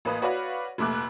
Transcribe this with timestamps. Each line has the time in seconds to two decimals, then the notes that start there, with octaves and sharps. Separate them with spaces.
0.05 A1 A#3 B4 D#6
0.22 F#4 B4 C#5 D5 F5 F#5
0.78 F1 A#2 A3 D6 F#6